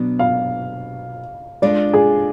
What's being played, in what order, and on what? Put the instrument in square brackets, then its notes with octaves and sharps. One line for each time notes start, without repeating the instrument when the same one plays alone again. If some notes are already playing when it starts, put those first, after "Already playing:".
Already playing: [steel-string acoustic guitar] B2 F#3 B3 D4
[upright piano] F5
[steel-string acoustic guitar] G#3 D4 F4 A4 [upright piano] D5
[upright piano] G#4